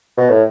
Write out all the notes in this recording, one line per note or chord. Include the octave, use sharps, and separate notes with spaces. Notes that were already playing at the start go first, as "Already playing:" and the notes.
B2
A2